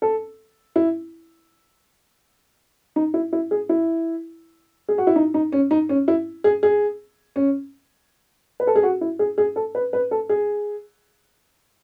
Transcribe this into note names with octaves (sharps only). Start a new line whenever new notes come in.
A4
E4
D#4
E4
E4
G#4
E4
G#4
F#4
E4
D#4
D#4
C#4
D#4
C#4
E4
G#4
G#4
C#4
B4
A4
G#4
F#4
E4
G#4
G#4
A4
B4
B4
A4
G#4